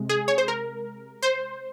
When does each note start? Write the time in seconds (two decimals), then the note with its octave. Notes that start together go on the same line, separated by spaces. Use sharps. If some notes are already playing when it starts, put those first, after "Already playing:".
Already playing: C3 G#3
0.09 G#4
0.28 C#5
0.38 C5
0.48 A#4
1.22 C5